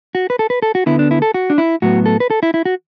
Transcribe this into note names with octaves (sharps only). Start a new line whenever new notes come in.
F#4
B4
A4
B4
A4
F#4
D2 D3 B3 E4
D4
E4
A4
F#4
D4
E4
A2 F#3 B3 F#4
A4
B4
A4
E4
E4
F#4